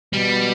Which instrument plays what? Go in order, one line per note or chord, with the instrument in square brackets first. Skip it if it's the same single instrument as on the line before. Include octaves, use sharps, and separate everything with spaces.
[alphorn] B2 [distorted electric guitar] G3